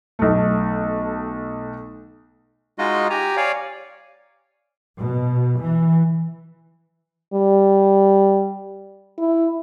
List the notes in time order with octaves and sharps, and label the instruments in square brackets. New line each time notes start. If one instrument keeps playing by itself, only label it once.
[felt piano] B1 A3
[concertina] G#3 D#4 F4 F#4 D#5
G4 G#5 A#5
C#5 D5 F5 G#5
[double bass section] B2
E3
[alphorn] G3
E4